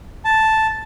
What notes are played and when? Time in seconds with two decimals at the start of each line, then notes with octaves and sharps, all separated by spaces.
0.25 A5